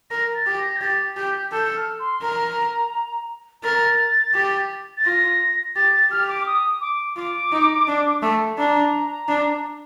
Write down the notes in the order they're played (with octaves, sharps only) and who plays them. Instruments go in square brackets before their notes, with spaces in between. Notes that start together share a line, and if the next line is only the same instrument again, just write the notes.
[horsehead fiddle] A#4 [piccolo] A#6
[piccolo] A6
[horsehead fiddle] G4
[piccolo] A#6
G6
[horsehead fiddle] G4 [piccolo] A6
[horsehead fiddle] G4 [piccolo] G6
[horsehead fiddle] A4 [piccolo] G6
[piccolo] F6
C6
[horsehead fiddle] A#4 [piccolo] A#5
[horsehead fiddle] A#4 [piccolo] A6
[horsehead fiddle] G4
[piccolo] A6
[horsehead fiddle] F4 [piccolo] A#6
[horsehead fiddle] G4 [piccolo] A6
[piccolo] A6
[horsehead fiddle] G4 [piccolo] F6
[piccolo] D6
D#6
D6
[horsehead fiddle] F4 [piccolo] D6
[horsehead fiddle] D#4
D4
A3
[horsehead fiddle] D4 [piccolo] A#5
[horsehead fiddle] D4